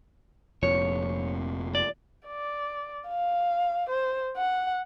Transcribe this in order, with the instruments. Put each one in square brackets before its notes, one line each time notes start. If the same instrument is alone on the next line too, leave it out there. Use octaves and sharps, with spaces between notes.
[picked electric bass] F1 F2 A#2 [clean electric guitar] C#5
[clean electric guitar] D5
[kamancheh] D5
F5
C5
F#5